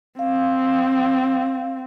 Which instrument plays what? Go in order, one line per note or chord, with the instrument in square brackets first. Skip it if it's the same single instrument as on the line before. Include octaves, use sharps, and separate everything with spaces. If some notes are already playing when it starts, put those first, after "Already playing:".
[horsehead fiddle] C4 [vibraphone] F5